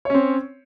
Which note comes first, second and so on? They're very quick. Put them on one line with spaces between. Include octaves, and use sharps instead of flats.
C#5 C#4 C4